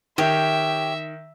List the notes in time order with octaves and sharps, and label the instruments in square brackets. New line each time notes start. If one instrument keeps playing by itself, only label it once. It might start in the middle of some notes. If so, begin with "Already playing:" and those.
[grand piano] D#3 [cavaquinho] G4 C#5 [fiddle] E5